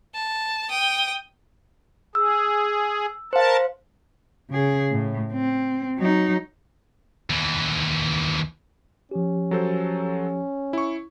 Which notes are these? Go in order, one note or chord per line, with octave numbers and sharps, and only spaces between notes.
A5
G5 D#6
G#4 E6
A#4 C5 F5 A5
C#3 G#4
A2
C4
F#3 D#4
D#2 E3
F3 C#4 G4
F#3 A4 C5
E4 C#6